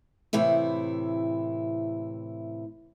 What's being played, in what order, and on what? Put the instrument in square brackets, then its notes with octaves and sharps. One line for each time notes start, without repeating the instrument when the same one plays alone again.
[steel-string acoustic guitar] A2 C3 E3 E4